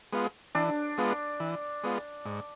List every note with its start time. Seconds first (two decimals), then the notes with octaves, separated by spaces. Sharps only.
0.13 G#3 B3 F4
0.55 E3 D4
0.98 G#3 B3 F4
1.40 E3
1.84 G#3 B3 F4
2.25 G#2